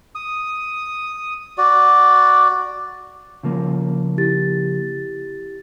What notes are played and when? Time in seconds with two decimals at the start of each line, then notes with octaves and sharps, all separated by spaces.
0.15 D#6
1.58 F#4 D5
3.43 C#3 F3 A#3
4.17 E4 G4 A6